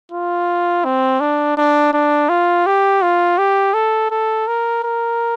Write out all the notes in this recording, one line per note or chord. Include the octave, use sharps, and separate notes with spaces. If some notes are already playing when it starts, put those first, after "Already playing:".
F4
C4
D4
D4
D4
F4
G4
F4
G4
A4
A4
A#4
A#4